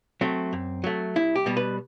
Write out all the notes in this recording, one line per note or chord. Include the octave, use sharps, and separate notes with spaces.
F#3 A3 C4
F#2
F#3 A3
C2 E4
G4
B2 G3
B4